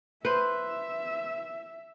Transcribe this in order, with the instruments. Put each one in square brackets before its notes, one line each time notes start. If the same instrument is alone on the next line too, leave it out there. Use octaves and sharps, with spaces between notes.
[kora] B4 C5 [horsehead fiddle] E5